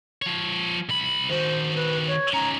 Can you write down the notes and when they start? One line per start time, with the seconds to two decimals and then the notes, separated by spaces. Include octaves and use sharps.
0.22 F3 C#5
0.89 C2 B5
1.30 D#3 F#4 C5
1.76 B4
2.07 C#5
2.33 C#4 D#4 A#5